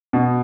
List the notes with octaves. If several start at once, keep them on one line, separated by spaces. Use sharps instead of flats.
B2